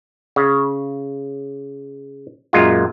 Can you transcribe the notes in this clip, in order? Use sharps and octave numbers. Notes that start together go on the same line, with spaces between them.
C#3
F#2 A#2 G#3 F4